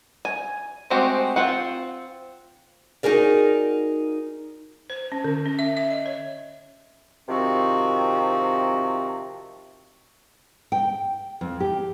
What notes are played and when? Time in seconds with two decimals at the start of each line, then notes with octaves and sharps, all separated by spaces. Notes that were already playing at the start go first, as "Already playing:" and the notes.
0.25 G#5
0.90 G#3 A3 C4 F#4 G4
1.36 C4 F4 F#5
3.03 D#4 F#4 G#4 A#4 D5
4.90 C5
5.12 C#4
5.24 D3
5.46 C#4
5.59 E5
5.77 E5
5.91 D#5
6.06 C#5
7.28 C3 D#3 F3 C4 F#4
10.72 G5
11.41 F2
11.60 G4